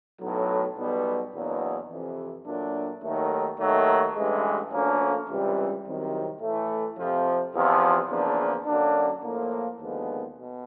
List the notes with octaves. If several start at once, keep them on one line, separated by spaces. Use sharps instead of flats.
B1 A2 F#3
B1 B2 G3 B3
E2 B2 F#3 A#3 D4
F2 C3 E3
A#2 F#3 A3 D4
D#2 D#3 F#3 A3
D#2 D#3 F#3 A3
A1 G2 E3 G#3
D2 D3 F3 A#3 C#4
C#2 C3 E3 G3
C2 C3 D#3 F#3
A2 E3 A3
F2 C3 F3
E2 C3 F3
E2 C#3 F3 A#3 D4
F#2 D3 F#3 A#3 D4
A2 F3 A#3
D#2 D3 F3 G#3 B3
B2